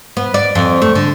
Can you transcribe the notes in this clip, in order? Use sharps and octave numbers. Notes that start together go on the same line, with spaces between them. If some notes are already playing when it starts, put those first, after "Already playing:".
B3
D5
F2
A3
D3